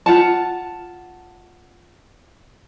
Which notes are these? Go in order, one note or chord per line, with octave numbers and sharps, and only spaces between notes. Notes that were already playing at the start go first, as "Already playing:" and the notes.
F4 F#5 A5